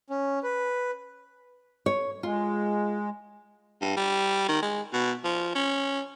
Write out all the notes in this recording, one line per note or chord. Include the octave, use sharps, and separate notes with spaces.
C#4
B4
C#5
G#3 F4
G2
G3
D#3
G#3
B2
F3
C#4